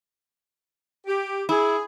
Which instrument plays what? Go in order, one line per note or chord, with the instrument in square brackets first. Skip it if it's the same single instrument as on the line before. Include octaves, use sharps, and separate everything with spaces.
[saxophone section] G4
[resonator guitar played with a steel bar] E4 [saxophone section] G#4